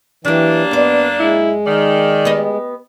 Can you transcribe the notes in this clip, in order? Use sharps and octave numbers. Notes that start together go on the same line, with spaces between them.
E3 F#3 A#3 D4 G4
F#2 B3 D5
G#3 E4
D#3 D5
B3 G4 D#5